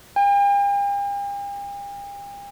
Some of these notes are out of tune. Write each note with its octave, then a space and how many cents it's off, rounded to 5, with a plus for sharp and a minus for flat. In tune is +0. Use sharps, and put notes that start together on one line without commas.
G5 +45